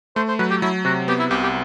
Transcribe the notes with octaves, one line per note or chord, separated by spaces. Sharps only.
A3 C5
C5
F#3 B4
G4
F#3 E4
C3 F#4
B3 G4
E4
C2 G4
G4